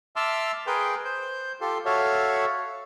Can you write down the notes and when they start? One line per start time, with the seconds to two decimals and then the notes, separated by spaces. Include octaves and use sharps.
0.16 E5 A5 C6 D6 E6 F6
0.67 G#4 A#4 B4 G5 C6 G6
1.04 C5 G6
1.61 F4 G4 A4 C6
1.85 F#4 A4 C#5 E5 F5